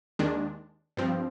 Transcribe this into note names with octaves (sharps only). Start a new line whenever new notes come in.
D#2 D#3 G#3 D4
G2 F3 C4